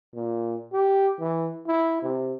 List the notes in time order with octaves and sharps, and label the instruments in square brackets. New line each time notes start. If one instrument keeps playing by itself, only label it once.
[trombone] A#2
G4
E3
E4
C3